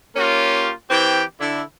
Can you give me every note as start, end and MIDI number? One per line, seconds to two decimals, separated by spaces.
0.16 0.71 58
0.16 0.71 61
0.16 0.71 65
0.16 0.71 67
0.90 1.23 52
0.90 1.23 60
0.90 1.23 67
0.90 1.23 79
1.40 1.62 50
1.40 1.62 64